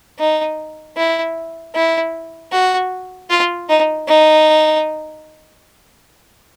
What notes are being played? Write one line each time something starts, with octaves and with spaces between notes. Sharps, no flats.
D#4
E4
E4
F#4
F4
D#4
D#4